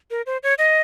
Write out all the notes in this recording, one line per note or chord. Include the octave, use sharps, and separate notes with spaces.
A#4
C5
C#5
D#5